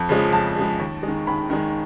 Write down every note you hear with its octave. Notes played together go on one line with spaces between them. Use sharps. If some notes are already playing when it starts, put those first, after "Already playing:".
Already playing: F2
C#3 F3 G#3
F2 A5
C#3 F3 G#3
D#2
D#3 G#3
D#2 B5
D#3 G#3